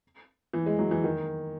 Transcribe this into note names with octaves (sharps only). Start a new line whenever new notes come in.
E3
G#3
F#3
E3
D#3